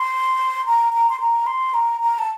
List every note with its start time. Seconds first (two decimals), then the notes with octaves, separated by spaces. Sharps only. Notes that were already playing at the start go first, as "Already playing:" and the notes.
Already playing: C6
0.66 A#5
0.93 A#5
1.10 C6
1.20 A#5
1.47 C6
1.74 A#5
2.01 A#5
2.19 A5